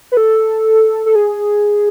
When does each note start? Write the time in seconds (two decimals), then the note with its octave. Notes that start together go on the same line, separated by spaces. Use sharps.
0.12 B4
0.17 A4
1.06 A4
1.15 G#4